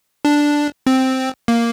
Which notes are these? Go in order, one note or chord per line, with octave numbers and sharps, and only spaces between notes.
D4
C4
A#3